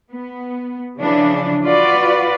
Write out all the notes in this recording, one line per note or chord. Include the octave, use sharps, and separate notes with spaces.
B3
C#3 E3 F3 D4
F4 F#4 B4 D5